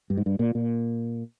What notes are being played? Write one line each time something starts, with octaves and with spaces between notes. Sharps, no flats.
G2
G#2
G2
A#2
A#2